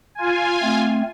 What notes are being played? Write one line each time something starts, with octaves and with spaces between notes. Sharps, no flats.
F4 G#5
A3 C4